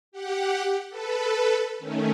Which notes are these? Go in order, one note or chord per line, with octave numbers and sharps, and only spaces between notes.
G4 F#5
A4 B4
D#3 A3 C#4